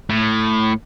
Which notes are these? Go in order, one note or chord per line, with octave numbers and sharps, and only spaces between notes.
A2